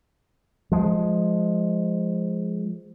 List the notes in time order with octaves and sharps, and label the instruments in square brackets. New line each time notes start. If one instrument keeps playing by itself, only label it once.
[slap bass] F3 G#3